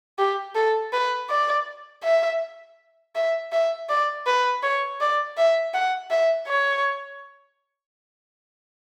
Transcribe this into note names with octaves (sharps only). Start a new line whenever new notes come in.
G4
A4
B4
D5
E5
E5
E5
D5
B4
C#5
D5
E5
F#5
E5
C#5